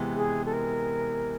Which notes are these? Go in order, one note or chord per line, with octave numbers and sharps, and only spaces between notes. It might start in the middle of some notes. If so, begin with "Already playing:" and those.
Already playing: C3 E3 G#3 B3
G#4
A4
A#4